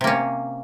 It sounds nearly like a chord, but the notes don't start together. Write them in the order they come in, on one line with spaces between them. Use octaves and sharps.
C3 A#3 C#4